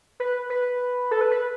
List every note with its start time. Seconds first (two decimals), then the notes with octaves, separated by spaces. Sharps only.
0.20 B4
0.50 B4
1.11 A4
1.21 B4
1.31 B4